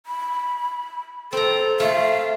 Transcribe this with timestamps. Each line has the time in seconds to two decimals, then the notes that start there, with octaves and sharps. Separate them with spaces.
0.06 B5
1.33 C4 A4 A#5
1.80 A3 F4 F5